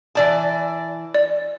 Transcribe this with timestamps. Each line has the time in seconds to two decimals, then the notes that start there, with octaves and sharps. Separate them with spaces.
0.15 E3 D5 A5
1.14 D5